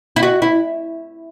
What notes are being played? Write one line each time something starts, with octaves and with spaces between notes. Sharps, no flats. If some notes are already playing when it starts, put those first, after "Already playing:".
E4
F#4
E4